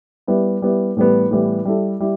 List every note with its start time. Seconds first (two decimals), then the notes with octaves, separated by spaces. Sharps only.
0.27 G3 B3 E4
0.62 G3 B3 E4
0.97 A2 E3 G3 B3
1.31 A2 E3 G3 B3
1.65 G3 E4 A4
2.00 G3 E4